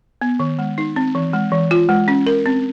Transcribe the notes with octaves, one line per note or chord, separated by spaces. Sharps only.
B3
D#3
G#3
D#4
C4
E3
G#3
E3
F4
G#3
C#4
A#4
C4